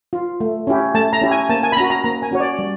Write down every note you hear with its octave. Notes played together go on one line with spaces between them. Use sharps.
F4
A3
C#4 E4 G4
A3 A5
A#5
C#4 E4 G4
G#5
A#3 A5
G#5
B5
C#4 F#4 A#5
A#5
A#3 A#5
G#5
C#4 F#4 C#5
D5
G3